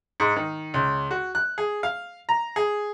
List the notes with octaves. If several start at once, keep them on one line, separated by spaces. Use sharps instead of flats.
G#2
D#3
C#2
F#4
F#6
G#4
F5
A#5
G#4